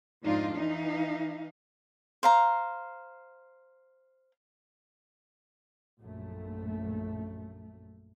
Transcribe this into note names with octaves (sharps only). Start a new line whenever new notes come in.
F2 G#2 D4 D#4 F4
E3 D#4 F5
C5 F5 A#5
A#1 F#2 A3